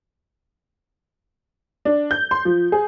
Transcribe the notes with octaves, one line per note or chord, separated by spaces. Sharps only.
D4
G6
C6
F3
G#4